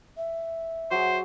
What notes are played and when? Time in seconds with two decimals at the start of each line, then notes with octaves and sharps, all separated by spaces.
0.17 E5
0.91 F#3 G#4 C5